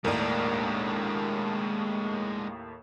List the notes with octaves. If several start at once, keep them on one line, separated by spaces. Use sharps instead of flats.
D#2 A2 G#3 A#3 D4 A#4 D5